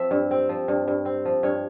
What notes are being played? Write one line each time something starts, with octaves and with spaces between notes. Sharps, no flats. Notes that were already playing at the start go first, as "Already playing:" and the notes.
Already playing: F3 C4 E5
G2
C4
F3
G2
G2
C4
F3
G2 C#5